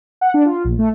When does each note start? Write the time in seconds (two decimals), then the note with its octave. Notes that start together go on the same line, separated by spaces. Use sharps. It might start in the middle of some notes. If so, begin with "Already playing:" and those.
0.21 F#5
0.34 D4
0.46 F4
0.64 A#1
0.79 A3